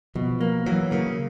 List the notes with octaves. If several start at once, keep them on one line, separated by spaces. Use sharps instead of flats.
B2 F3
A#3
E3 F#3
C#3 A#3